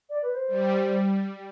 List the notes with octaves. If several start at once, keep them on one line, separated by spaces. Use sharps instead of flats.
D5
B4
C5
G3